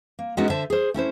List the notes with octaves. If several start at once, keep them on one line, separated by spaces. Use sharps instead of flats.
A#3
G#3 B3 C#4 D#4 E4 F#4
D3 C5 E5 A5
G#4 C5
A3 C#4 E4 C5